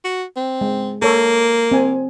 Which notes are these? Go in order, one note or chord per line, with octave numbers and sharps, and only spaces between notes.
F#4
C4
G#3
A#3 A4 C#5
C4 G#5